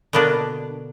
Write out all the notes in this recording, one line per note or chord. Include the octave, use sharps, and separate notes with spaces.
B2 D3 A#3 B3 D4